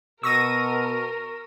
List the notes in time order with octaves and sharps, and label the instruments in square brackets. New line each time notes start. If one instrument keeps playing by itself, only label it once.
[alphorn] B2 [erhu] A#4 [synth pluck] C#6 A#6 D#7 [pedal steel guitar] E6